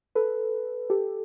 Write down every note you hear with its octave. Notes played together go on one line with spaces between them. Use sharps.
A4 B4
G4 A4